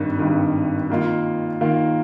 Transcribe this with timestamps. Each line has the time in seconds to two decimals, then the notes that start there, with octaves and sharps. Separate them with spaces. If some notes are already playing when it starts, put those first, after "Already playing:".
Already playing: G#1 G2 D#3
0.19 G#1 G2 D#3
0.90 D#3 A#3 F4
1.61 D#3 A#3 F4